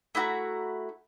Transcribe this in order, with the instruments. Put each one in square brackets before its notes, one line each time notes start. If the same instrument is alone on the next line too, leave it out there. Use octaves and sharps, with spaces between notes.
[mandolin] A3 E4 F#4 A#5